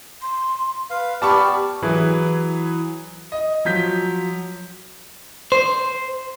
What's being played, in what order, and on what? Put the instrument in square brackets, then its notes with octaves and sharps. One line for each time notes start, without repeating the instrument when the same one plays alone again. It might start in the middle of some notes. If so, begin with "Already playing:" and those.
[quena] C6
[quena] B4 [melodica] F5
[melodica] B3 D5 [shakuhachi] G4 [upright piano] A5 B5 C#6 [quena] F6
[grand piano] E3 F#3 E4 G#4 B4
D#5
F3 F#3 G6 B6
[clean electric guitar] C5